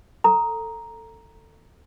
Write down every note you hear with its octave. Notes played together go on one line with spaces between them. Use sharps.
A4 A#5